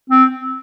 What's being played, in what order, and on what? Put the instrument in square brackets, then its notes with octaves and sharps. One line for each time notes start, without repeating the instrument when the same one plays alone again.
[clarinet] C4